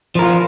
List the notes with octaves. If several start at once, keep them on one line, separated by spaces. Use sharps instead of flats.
F3 F4 A#4